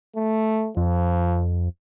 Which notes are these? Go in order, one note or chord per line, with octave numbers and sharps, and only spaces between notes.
A3
F2 F3